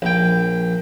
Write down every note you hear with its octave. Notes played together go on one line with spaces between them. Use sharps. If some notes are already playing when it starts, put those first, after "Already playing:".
A#1 G5